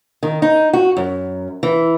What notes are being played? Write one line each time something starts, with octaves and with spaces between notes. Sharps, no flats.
D#3
D#4
F#4
F#2
E3